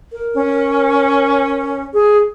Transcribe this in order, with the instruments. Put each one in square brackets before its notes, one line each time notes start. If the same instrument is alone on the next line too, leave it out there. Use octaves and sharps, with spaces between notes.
[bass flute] A#4
[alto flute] C#4
G#4